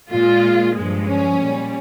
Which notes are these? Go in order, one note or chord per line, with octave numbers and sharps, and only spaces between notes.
A#2 G#3 F4
G2 F3 G#3
C#4
A#2 G3